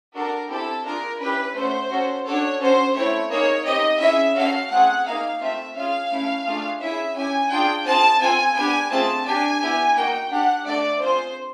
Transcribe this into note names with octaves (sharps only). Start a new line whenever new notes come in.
D4 F#4 A4 A#4
C4 E4 G4 A4
D4 F4 G#4 A#4
C#4 E4 G4 B4
A3 C#4 F#4 C5
C#4 F#4 A4
D4 F#4 A4 C#5
C#4 F#4 A4 C5
A3 C4 E4 C#5
A#3 D#4 G#4 C#5
C4 D#4 G4 D#5
C#4 E4 G#4 E5
C#4 F#4 A4 F5
A3 C4 F4 G#4 F#5
A#3 D#4 G#4 F5
A3 C4 F4 E5
C#4 F4 G#4 F5
A3 C#4 E4
A3 D4 F4 G#4
C#4 E4 G#4 E5
C#4 E4 G4 G#5
D4 F4 G#4 G5
C4 F4 G#4 A5
C4 F4 A4 G#5
B3 D4 G4 G#5
A3 C4 F4 G#4 A5
D4 G4 G#5
B3 E4 G4
A#3 D#4 F#4 G5
D4 G4 F#5
A3 D4 F#4 A4 D5
C4 F4 G#4 C5